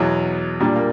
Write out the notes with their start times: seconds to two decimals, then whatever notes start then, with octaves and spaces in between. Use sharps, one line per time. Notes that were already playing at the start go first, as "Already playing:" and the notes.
Already playing: E2 B2 F#3
0.60 A#2 G3 D4
0.76 A#3